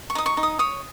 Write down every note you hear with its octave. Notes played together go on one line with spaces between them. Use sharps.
C#6
D#4 D#6
C#6
D#4
D#6
C#5 D#6